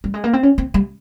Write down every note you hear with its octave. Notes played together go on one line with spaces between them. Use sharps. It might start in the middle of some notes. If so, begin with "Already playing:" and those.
G3
G#3
A#3
C4
C#4
C4
G3